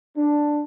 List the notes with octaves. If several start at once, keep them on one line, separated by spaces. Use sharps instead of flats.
D4